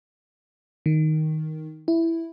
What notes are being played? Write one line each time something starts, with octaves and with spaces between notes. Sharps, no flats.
D#3
E4